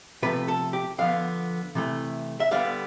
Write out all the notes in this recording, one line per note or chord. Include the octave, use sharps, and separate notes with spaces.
C3 F3 A3 B4
A4
G4
D3 F3 B3 F5
C3 E3 A3
E5
D3 G3 B3 F5